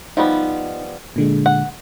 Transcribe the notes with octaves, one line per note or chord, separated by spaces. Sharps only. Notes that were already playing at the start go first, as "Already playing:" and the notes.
F3 G3 B3 D#4
A#2 D3 G#3
F#5